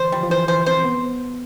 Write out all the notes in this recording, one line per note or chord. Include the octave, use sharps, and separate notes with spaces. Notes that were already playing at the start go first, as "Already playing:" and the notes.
Already playing: D3 E3 C5
F3 G3
F3
E3 C5
E3 C5
C4 C5
B3